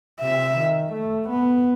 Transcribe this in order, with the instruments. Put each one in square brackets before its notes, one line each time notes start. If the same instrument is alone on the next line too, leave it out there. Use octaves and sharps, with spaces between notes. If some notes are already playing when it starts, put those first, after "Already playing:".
[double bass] C3 [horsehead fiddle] E5
[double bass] D#3
A3
B3